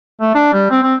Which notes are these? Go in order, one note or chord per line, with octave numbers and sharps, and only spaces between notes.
A3
D4
G3
C4
C4